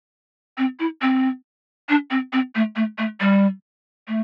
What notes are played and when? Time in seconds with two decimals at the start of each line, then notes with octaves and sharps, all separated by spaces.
0.58 C4
0.79 E4
1.02 C4
1.89 D4
2.10 C4
2.33 C4
2.55 A3
2.76 A3
2.98 A3
3.20 G3
4.08 A3